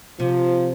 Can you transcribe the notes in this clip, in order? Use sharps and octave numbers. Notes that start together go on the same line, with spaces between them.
C3 F3